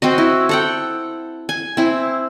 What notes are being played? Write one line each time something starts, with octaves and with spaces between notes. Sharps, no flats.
C4 F#4 D#5
E4
A4 F#5 G5
G#5
C4 E4